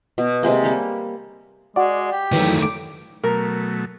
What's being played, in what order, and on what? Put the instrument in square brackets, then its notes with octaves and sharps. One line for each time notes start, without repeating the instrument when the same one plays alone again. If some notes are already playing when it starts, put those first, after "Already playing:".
[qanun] B2
C3 G#3 A#3
G3 A#3
[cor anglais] G#3 [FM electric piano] F#4 D5
[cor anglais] G4
[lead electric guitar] D#3 A3 [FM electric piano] E3 F#3
[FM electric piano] D6
[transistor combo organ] B2 F#3 A3 [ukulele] A#4